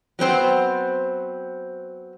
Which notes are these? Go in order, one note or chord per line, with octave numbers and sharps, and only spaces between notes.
F#3 B3 C4 C5